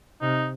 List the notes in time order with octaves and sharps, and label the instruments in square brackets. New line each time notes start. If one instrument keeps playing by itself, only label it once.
[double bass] C3 [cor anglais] D#4